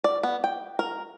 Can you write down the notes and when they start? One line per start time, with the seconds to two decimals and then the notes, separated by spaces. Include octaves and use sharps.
0.04 D5
0.23 B3
0.44 G5
0.79 A#4